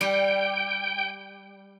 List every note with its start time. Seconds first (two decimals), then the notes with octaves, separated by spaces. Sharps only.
0.01 G3 G5